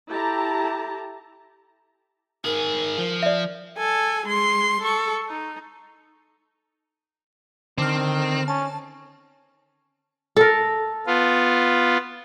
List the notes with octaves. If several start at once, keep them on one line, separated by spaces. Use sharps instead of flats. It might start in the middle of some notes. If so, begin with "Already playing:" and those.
E4 G4 A4 A5 A#5
D#3 G#4 A#4
F3
D5 E5
A4 G#5
G#3 C6
A4 C#6
D#4
D3 D#3 C4 F6
C#4 A5
A4 A#4
B3 F4